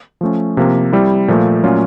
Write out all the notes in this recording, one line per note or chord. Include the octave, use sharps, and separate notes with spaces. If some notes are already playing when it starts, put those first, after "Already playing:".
F3 A3 C#4
C3 F3 A#3
G3 C4 E4
A#2 F3 A3
A#2 F#3 A3 C#4 F4